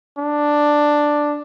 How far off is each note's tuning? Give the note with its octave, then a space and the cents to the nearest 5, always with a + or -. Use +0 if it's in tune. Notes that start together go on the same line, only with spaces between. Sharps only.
D4 +5